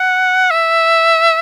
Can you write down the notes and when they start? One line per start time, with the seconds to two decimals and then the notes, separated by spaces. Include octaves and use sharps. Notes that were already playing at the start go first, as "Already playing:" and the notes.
Already playing: F#5
0.51 E5